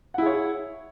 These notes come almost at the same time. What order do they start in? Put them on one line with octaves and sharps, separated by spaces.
F#5 E4 G#4 C#5